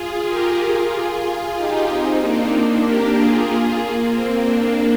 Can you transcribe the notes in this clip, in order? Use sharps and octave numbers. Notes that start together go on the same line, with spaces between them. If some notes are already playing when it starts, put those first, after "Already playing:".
Already playing: F4 G#4
G4 A#4
F4 G#4
D#4 G4
C4 D#4
A#3 D4
A#3 D4
G4 A#4
F4 G#4
F4 G#4
A#3
C4
A#3 D4